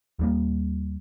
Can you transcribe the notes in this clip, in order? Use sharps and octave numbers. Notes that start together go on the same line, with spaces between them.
D#2 G3 A#3